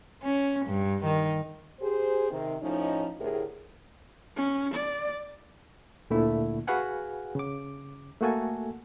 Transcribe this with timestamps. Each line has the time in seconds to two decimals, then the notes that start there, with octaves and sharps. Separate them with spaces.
0.22 C#4
0.67 G2
1.05 D#3
1.80 G4 G#4 C5
2.30 C3 D#3 C4
2.61 A2 F3 C#4 D#4
3.18 D2 A2 E4 G4 G#4 A#4
4.37 C#4
4.74 D5
6.10 D2 A#2 D3 A3 E4
6.67 F#4 G#4 B4 F5 F#5 G#5
7.35 C#3 D6
8.21 A3 A#3 F#4 A4 G#5